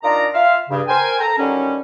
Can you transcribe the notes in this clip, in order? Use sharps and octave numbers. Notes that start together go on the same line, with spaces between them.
A#2 D4 D#4 F4 D5 A#5
F4 E5 F5
G2 C#3
A#4 C5 G5 G#5
A4 A#5
D3 D#3 F#3 G3 C#4